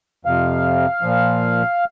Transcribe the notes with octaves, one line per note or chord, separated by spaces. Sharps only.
F2 C3 F3 F5
A#2 F3